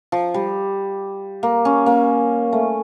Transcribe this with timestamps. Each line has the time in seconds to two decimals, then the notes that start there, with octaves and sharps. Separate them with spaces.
0.12 F3
0.34 G3
1.43 A#3
1.65 C#4
1.86 A#3
2.53 A3